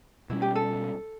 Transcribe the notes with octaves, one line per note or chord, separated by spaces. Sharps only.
B2 G3 C#4 E4
G4
A4